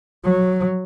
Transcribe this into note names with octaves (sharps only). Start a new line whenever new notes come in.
F#3